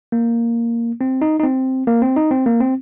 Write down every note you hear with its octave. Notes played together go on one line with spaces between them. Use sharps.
A#3
C4
D#4
D#4
C4
A#3
C4
D#4
C4
A#3
C4